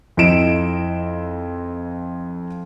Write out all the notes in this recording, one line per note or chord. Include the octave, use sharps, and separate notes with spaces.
F2 E4 D#5 D7 E7